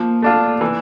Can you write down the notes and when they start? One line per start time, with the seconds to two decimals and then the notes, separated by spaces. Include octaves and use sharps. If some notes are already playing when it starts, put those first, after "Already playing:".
Already playing: F3 A#3
0.22 A3 D4 F4
0.61 E3